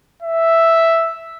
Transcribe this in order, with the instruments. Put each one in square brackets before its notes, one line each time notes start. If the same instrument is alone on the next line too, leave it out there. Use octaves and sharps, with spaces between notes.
[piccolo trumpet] E5